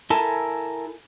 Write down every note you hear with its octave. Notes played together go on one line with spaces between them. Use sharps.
E4 A4 A#4 G#5 A5